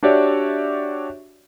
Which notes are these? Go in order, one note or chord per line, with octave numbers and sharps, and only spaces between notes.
D4 F#4 G4 C#5 D5 E5